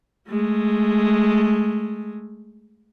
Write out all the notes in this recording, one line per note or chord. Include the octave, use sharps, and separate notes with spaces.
G#3 A3